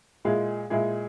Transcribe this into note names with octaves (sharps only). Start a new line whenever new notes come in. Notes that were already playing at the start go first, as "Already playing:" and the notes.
A#2 G#3 E4 G#4
A#2 G#3 E4 G#4